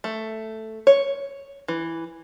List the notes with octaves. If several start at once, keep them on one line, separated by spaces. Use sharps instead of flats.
A3
C#5
E3